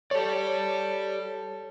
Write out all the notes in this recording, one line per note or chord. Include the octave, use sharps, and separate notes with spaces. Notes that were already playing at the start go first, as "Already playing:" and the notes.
G4 A4 C#5 D5